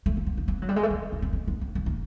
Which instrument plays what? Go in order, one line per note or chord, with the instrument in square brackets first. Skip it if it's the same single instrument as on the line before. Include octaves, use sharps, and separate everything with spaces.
[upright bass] A3
A#3
B3
B3
B3
F#3
G3
G#3
A3
A#3
B3
C4
C4
B3
C4
B3
A#3